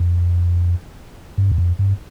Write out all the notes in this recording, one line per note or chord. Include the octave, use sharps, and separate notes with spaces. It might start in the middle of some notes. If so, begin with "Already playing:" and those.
Already playing: F2
G2
E2
F2
G2